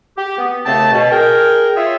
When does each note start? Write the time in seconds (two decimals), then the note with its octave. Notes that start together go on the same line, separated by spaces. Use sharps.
0.18 G4
0.38 B3
0.66 D#2 C#3 A3 C4 G5 A5
0.92 B2
1.11 G#4 A#4 G5
1.77 F4 G#4 C#5 E5